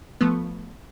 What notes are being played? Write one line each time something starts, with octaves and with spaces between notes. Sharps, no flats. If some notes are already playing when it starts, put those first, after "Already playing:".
F3 A3 B3